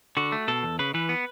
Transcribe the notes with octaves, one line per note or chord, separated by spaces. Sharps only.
D3 F#4
A3
B2 A4
E2
C#3 B4
E3 B4
B3